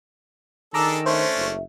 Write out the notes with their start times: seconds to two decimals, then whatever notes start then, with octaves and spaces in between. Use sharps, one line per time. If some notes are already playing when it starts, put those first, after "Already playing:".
0.74 D#3 D4 G#4 A4 A#5 D6 E6
1.06 A3 C#4 D4 C5 E5
1.37 F#1